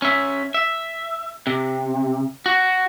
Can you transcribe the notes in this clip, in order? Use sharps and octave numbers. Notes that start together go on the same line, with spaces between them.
C#4 E5
E5
C3
F#4